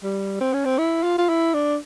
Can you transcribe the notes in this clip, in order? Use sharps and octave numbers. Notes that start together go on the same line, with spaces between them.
G3
C4
C#4
C4
E4
F4
F4
E4
D4